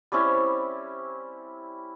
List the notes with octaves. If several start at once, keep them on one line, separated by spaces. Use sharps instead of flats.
G3 C4 C#4 E4